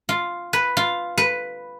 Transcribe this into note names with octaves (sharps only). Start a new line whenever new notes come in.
F4
B4
F4
B4